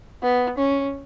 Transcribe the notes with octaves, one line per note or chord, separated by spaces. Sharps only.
B3
C#4